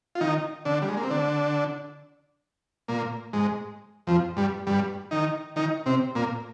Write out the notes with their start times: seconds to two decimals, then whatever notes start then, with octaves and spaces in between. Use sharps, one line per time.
0.15 F4
0.21 D#3 D#4
0.65 D3 D4
0.82 G3
0.88 G#3
0.97 A#3
1.04 C4
1.11 D3 D4
2.88 A#2 A#3
3.33 G#2 G#3
4.07 F2 F3
4.37 G2 G3
4.67 G2 G3
5.11 D#3 D#4
5.56 D#3 D#4
5.86 C3 C4
6.15 A#2 A#3